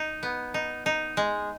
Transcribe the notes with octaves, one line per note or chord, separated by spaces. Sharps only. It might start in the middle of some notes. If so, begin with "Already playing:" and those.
Already playing: D#4
B3
D#4
D#4
G#3